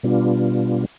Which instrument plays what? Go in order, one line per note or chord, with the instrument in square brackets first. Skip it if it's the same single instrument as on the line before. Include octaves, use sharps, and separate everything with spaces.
[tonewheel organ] B2 G3 B3 D4 F4